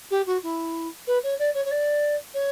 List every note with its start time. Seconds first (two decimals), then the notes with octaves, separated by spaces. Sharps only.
0.11 G4
0.27 F#4
0.43 E4
1.07 B4
1.24 C#5
1.39 D5
1.54 C#5
1.65 C#5
1.71 D5
2.34 C#5